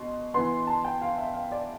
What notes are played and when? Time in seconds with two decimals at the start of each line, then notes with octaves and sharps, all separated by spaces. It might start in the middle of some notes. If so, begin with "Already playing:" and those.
Already playing: B2 C6
0.34 E3 B3 C6
0.67 A5
0.85 G5
1.02 F5
1.18 E5
1.34 F5
1.52 D5